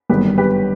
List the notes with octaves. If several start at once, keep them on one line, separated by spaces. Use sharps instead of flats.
G1 F#2 D#3 G3 B3 G4 B4
G4 B4